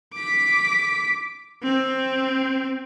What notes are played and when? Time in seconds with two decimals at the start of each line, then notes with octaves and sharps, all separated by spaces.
0.14 D6 B6
1.63 C4